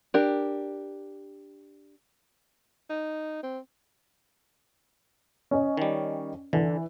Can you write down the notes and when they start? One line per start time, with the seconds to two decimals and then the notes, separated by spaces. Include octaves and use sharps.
0.14 D4 G4 A#4
2.90 D#4
3.43 C4
5.51 C#4 D#5
5.77 D#3 G3
6.53 D3 E3